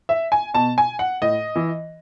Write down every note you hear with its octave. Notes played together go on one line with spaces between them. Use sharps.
E5
G#5
B2 A5
G#5
F#5
A2 D#5
E3